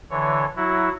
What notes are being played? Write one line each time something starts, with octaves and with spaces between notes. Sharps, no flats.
D3 E3 C#5
F#3 E4 F#4